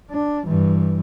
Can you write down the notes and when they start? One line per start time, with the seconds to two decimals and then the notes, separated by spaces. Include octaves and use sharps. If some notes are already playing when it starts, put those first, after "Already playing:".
0.11 D4
0.46 G2 E3